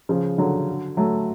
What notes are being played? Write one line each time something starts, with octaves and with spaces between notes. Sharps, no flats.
C#3 F3
D3 F#3
F#3 A3